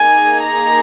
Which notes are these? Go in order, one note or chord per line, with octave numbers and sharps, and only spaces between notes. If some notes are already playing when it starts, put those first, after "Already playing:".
Already playing: A#3 D#4 G#4 G#5
A#5